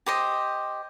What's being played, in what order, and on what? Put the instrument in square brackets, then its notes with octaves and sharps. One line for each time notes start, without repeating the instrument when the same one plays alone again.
[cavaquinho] G4 C5 D#5